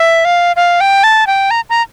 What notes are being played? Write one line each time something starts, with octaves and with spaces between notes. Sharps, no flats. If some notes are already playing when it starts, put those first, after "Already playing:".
Already playing: E5
F5
F5
G5
A5
G5
A#5
A#5